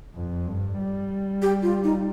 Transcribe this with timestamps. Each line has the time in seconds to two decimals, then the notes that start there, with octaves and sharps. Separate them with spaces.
0.16 F2
0.47 G2
0.78 G3
1.42 G4
1.62 F4
1.84 D#4